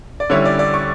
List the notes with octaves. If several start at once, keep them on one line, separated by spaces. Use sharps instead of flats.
D5
D3 G3 C#4 E4 C#5
D5
D5
C#6